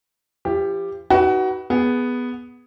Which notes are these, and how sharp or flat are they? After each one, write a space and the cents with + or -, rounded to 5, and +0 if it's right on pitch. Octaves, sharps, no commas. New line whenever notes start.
F3 -40 G4 +10
D#4 +20 F#4 +25 B4 -10
B3 +0 G#4 +0